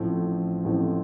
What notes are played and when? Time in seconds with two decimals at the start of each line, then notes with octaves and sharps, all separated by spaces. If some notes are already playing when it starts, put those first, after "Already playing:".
Already playing: A1 A2 F3 C4
0.65 A1 A2 F3 C4